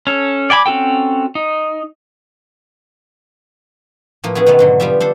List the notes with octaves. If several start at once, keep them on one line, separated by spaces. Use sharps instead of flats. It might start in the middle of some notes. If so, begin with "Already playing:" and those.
C#4 A4
D5 G5 G#5 B5 D6
C4 C#4 F#4 A4 G5
D#4
A2 F3 A#3
B3 C#4 E4 G#4
B2 D#3 G#3 A3 B3
G#2 D3 F#3
F3 G3 B3 F4 G4 E5
D4 A4 C5